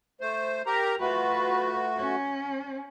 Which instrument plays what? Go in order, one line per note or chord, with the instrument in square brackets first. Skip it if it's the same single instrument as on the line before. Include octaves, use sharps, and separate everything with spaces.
[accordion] A3 C5
G4 A#4 A#5
[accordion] A3 F#4 [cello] F4 B4
[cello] C#4